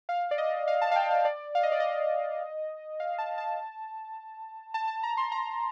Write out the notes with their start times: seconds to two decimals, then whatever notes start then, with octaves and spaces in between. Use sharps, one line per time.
0.09 F5
0.31 D5
0.38 D#5
0.68 F5
0.81 A5
0.91 F5
0.96 G5
1.11 F5
1.25 D5
1.55 F5
1.63 D#5
1.72 D5
1.80 D#5
3.00 F5
3.18 A5
3.38 A5
4.74 A5
4.88 A5
5.03 A#5
5.17 C6
5.32 A#5